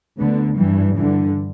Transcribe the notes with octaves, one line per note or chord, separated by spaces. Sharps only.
D2 D3 B3
G2 E3 G3
G2 D3 E3